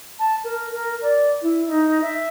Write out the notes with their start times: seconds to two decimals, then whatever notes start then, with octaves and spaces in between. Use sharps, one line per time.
0.19 A5
0.44 A#4
0.71 A#4
1.02 D5
1.42 E4
1.67 D#4
2.02 E5